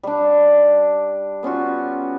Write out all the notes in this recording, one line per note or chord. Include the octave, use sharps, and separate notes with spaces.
G3 D4
B3 C#4 F4 F#4